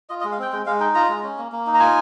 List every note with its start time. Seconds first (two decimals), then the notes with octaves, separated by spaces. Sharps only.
0.09 F4 D#5
0.21 D#5
0.24 G#3
0.32 F5
0.39 C4 G5
0.53 G#3 G5
0.66 G#3 F5
0.80 D#4 G5
0.95 F4 A#5
1.09 G#3
1.23 C#4
1.38 A#3
1.52 A#3
1.67 D#4
1.74 A#5
1.80 F4 G#5